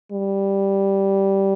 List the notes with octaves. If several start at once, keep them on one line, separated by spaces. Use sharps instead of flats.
G3